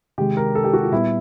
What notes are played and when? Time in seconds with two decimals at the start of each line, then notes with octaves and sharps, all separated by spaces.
0.18 C3 D#3 G#3 G4
0.37 A#4
0.55 A4
0.64 G4
0.73 F#4
0.83 F4
0.92 A#2 G3 B3 E4